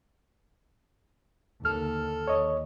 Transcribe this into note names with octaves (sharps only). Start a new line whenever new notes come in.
D#2 D3 A4 F6
D#2 C#5 D#5